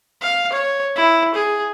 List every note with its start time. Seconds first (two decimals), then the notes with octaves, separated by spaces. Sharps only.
0.22 F5
0.53 C#5
0.96 E4
1.35 G#4